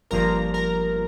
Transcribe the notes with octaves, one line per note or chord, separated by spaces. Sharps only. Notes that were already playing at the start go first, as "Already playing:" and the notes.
G1 G2 F3 A#3 A#4 A#5
A#4 A#5